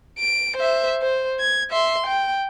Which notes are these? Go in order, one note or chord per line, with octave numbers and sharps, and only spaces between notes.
D7
C5 E5
C5
G#6
E5 C6
G5